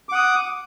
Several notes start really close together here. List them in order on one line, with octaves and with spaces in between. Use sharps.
D6 F#5 D#6